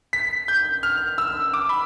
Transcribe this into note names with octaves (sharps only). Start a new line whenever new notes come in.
B6
G6
F6
E6
D6
B5